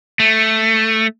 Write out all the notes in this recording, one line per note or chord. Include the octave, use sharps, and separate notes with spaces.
A3